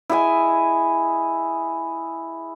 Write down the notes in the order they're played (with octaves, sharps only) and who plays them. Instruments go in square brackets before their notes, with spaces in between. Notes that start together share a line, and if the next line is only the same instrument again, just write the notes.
[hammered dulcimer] E4 G#4 D#5 G#5